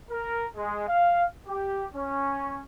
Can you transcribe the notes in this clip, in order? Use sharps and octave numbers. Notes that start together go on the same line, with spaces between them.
A#4
G#3
F5
G4
C#4